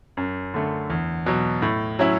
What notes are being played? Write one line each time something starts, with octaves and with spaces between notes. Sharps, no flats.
F#2
D3 A3
E2
B2 F#3
A2
F#3 C#4 E4